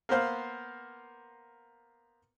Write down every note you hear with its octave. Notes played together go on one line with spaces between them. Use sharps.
A#3 B3 C5 F5